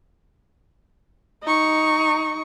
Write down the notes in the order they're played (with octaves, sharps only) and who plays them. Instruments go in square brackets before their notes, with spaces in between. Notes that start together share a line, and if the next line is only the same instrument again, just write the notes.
[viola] D#4 C#6